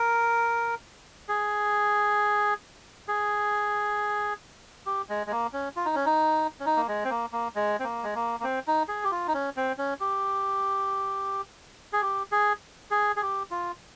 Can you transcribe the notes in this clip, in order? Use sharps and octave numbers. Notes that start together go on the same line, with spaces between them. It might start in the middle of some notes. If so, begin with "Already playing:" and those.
Already playing: A#4
G#4
G#4
G4
G#3
G#3
A#3
C#4
F4
D#4
C#4
D#4
C#4
D#4
A#3
G#3
C4
A#3
A#3
G#3
C4
A#3
G#3
A#3
A#3
C4
D#4
G#4
G4
F4
D#4
C#4
C4
C#4
G4
G#4
G4
G#4
G#4
G#4
G4
F4